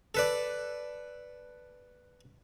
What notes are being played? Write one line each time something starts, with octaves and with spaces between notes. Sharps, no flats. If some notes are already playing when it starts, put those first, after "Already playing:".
A4 B4 D5